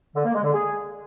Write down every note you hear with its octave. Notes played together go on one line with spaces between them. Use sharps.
D3
A#3
G#3
D3
G#4